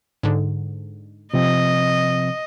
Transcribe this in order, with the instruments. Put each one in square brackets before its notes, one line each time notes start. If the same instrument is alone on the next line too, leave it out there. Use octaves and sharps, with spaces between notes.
[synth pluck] G#2 D3
[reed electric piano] C3 F3 C4 [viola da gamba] D#5